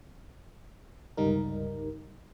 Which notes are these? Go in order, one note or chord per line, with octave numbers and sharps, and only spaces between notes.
G1 C#2 G3 D#4 A#4